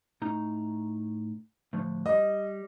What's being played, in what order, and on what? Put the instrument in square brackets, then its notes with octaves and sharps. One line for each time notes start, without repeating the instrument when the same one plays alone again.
[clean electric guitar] A2 D#4 A#5
A2 D3 F3
[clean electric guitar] G3 [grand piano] D#5